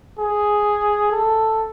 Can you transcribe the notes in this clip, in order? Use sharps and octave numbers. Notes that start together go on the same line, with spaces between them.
G#4
A4